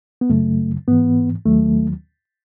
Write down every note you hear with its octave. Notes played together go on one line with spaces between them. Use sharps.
B3
F#2 C#3 F#3 A3
G#2 E3 B3
D#2 D#3 F#3 A3